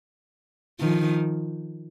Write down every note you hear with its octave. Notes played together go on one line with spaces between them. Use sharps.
D#3 F3